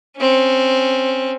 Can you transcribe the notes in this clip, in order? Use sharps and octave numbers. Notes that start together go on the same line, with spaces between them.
C4 C#4